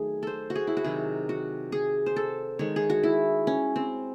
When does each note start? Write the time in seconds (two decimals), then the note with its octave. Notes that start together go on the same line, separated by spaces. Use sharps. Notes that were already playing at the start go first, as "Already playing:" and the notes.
Already playing: D#3 F#3 A3 G#4
0.23 A4 C5
0.50 F#4
0.56 G#4
0.67 E4
0.77 F#4
0.84 C3 D#3 F#3 G#4
1.29 F#4
1.72 G#4
2.06 C5
2.16 A4
2.59 D#3 G#3 C#5
2.76 G#4
2.90 F#4
3.03 E4
3.47 C#4
3.76 C4